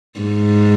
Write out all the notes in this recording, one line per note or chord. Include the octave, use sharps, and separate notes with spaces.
G#2